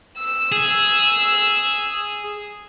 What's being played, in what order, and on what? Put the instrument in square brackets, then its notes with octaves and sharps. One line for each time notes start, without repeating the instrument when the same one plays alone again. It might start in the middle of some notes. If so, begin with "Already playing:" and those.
[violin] E6
[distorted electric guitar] G#4